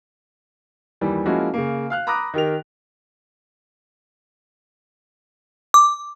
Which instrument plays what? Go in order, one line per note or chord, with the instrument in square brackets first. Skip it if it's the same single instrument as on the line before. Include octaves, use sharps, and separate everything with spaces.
[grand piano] D#2 E3 G3
F3 G#3 A#3 C#4 E4 F#4
C#3 A#3
F5 F6 F#6
A#5 B5 D6 D#6 F#6 A#6
D#3 G4 A#4 F7
[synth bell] D6